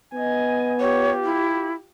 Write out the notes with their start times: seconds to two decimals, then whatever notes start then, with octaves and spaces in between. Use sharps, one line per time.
0.15 B3 D#5 G#5
0.80 F4 G4 C#5
1.24 E4